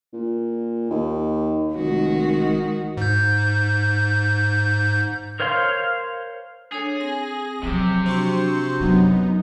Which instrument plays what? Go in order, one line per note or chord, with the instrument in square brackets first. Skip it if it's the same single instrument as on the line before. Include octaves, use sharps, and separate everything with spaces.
[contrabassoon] A#2
D#2
[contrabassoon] F1 [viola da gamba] D#3 G#3 F#4
[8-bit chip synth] G#2 G6
[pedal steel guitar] A#4 C5 C#5 F5 C6
[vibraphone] D4 A4 C#5 [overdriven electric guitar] G#4
[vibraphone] C4 [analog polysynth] A#6
[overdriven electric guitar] C3 G4 [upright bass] F3 F#3
[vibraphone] D4 F#4 [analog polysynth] C5 C6 C#6
[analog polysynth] F#2 B3 D#4 [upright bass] F#3